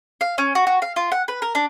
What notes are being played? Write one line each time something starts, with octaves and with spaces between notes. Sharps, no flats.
F5
C#4
F#4
F#4
F5
F4
F#5
B4
A#4
D4